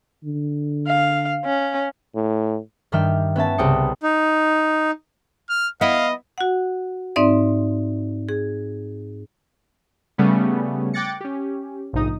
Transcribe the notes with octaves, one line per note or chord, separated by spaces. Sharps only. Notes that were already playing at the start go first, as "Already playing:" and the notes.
D3
F5
C#4
A2
G2 D#3 G3 E5 G5 F6
B3 C#4 E5 A5
C2 C#3 B3 G5 D#6 C#7
D#4
F6
B3 E4 D#5 F5
F#4 F#5
G#2 C4 D#4 D5 E5
G#4
C#3 G3 A3 B3 C#4
G5 D6 F#6 A6 A#6 C#7
C#4 G4
A#1 G#2 C3 D#4 D#6